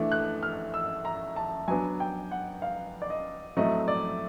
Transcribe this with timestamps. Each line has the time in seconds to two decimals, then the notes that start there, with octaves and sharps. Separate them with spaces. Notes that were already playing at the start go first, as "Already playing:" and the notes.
Already playing: E3 A3 D4
0.12 F#6
0.43 F6
0.74 E6
1.05 A#5
1.36 A5
1.68 F#3 B3 D4 G#5
2.00 G5
2.31 F#5
2.62 F5
3.02 D5
3.10 D#5
3.57 A2 F#3 A3 C4 D#5
3.88 D5